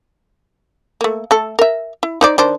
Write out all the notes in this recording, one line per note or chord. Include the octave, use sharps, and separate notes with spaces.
A3 A#3
A3 A4
A#4 E5
E4
D#4 C5 D5
D#3 D4 C5